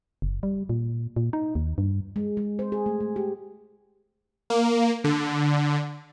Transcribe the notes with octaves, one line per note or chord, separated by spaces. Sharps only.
F#1
G3
A#2
A#2
D#4
D#2
G2
G#3
G#3
C5
G#4
A3
A3
G4
A#3
D3